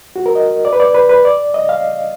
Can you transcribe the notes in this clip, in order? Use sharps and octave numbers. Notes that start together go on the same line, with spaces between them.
F#4
A#4
D#5
D5
B4
D5
B4
B4
D5
D#5
F5